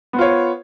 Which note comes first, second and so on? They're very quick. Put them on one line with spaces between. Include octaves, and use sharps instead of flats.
B3 C5 F4 C#5